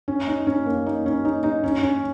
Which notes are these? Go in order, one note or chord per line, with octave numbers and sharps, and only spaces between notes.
C#4
D#4
C#4
A#3
D#4
C#4
D#4
D#4
C#4
C#4